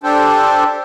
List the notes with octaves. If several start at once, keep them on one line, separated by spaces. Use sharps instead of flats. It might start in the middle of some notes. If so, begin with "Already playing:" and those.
D4 G4 A4 C5